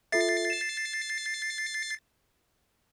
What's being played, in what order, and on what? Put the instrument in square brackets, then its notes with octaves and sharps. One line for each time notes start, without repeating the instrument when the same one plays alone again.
[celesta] F4 A4 E5 [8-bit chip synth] A6 C7
[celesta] E7